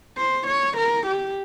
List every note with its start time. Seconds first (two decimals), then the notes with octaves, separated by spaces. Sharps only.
0.18 C5
0.47 C#5
0.77 A#4
1.06 G4